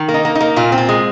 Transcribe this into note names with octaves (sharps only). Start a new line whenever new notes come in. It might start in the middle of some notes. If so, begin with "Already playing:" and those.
Already playing: D#3
A#3
D#4
A#3
D#4
A#3
A#2 F4
C4
F4
G#3